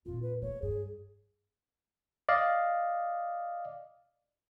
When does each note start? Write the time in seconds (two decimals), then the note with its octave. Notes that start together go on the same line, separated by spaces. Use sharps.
0.06 F2 A#2 F4
0.22 B4
0.42 A#3 C#5
0.62 G2 G#4
2.29 D5 D#5 F5